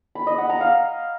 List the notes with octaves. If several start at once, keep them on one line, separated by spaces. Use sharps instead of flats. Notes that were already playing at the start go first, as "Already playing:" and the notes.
B5
D#5
F#5
A#5
F5